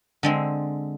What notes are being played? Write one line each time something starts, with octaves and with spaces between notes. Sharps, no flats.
D3 G#3 C4